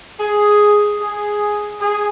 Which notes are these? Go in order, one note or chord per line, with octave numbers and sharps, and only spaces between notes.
G#4
G#4
G#4